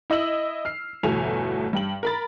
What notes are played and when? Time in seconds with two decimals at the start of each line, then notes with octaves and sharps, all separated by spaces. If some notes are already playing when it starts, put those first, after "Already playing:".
0.10 E4 D#5 E6 F#7
0.65 F6 C7
1.03 G1 E2 B2 A3 G#5 F7
1.73 G2 G5 F#7
2.03 A#4 B5 A6